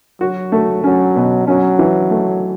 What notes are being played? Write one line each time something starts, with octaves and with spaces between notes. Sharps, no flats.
F#3 F#4
A3
F#3 C#4
B2
F#3 C#4
E3
A3